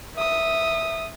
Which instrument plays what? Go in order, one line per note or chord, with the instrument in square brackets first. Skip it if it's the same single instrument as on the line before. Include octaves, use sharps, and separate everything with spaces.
[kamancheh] E5 D#6